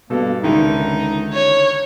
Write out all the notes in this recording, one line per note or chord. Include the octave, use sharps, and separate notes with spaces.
G2 B2 A#3 A4
C#2 D3 D#3 D#4 E4
C#5